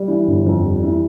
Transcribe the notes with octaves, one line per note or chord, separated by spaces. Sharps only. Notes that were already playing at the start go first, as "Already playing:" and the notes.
Already playing: G3
E3
G1
F2
G3
E3